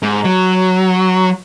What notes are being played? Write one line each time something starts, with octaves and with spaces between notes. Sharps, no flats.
G#2
F#3